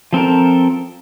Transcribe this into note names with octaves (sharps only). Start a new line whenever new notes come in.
F3 C4 A4 A#4